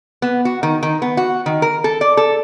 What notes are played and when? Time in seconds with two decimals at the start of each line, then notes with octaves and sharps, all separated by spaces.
0.22 B3
0.45 F#4
0.63 D#3
0.83 D#3
1.02 B3
1.17 F#4
1.46 D#3
1.62 A#4
1.84 A4
2.01 D5
2.17 A4